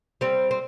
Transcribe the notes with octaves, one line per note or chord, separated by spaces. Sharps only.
G3 C4
C4